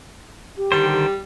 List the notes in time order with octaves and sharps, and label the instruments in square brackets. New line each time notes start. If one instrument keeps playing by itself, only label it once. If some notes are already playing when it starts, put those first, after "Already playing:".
[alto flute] G4
[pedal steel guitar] D3 D#3 C5 [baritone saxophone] G3
[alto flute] G4